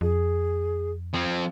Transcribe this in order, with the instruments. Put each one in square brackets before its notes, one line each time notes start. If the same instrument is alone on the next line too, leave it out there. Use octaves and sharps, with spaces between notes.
[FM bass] F2 [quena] G#4
[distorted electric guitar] F3 C4